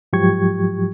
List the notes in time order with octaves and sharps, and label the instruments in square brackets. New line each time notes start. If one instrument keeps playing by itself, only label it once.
[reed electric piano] G#2 F3 F#3 G4 C#6 G#6